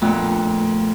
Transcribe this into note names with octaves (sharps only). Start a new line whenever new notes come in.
F2 A#2 A3 B3 D4